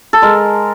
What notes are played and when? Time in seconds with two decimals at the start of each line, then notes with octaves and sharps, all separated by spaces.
0.13 A4
0.22 G#3 A#4